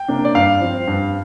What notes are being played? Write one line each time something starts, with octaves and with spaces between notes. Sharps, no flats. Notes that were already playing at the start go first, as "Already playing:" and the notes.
Already playing: G5
C3 A#3 D4
D5
G2 F5
F3 C4
G2